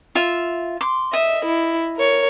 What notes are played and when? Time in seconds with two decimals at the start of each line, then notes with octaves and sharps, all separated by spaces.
0.15 F4 E5
0.81 C6 D6
1.13 D#5 E5
1.46 E4
1.97 A#4 C#5